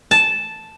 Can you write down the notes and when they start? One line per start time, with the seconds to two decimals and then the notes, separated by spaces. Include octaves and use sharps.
0.11 A5